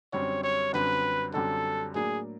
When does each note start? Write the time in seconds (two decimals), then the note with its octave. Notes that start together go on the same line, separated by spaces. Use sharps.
0.13 F#2 D3 G3 C4 C#5
0.43 C#5
0.73 F#2 D3 G3 C4 B4
1.34 F#2 D3 G3 C4 A4
1.94 A2 F#3 A#3 D4 G#4